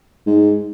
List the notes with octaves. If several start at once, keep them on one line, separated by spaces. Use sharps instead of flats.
G#2